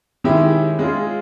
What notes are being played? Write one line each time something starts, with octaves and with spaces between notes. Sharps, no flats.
D#3 G#3 C#4 E4 G4
G#3 C#4 F4 G#4